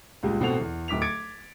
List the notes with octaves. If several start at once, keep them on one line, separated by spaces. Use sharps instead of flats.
C#2 A#2 G3 G#3
A1 B2 C4 A4 F#5 F7
E2
D1 D6 B6 F7
D6 G#6 A6 C#7 D7